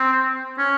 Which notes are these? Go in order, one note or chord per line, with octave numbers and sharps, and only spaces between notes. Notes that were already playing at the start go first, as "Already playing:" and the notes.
Already playing: C4
C#4